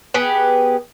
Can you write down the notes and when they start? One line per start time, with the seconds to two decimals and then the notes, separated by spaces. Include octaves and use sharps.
0.14 B3 G4 G#4